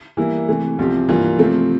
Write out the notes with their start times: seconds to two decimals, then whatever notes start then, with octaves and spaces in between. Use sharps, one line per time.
0.17 E3 G3 A#3 E4
0.48 C3 E3 A3
0.79 C2 C3 F3 C4 G4
1.09 G2 E3 A#3 F4
1.38 C3 F3 A3 C4